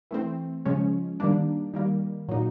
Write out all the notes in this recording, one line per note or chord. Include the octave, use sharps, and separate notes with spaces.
E3 A3 C4
C#3 F3 G#3 C#4
D#3 G3 A#3 D4
D#3 G3 A#3
A#2 F#3 A#3 D#4